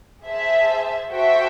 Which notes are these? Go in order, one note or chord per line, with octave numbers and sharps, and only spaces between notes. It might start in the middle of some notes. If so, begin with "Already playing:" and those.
G#4 C5 E5 A5
F#4 A4 C5 E5 G5